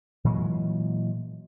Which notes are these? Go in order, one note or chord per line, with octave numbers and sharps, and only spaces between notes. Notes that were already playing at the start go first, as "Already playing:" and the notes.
A#2 E3 F#3 G#3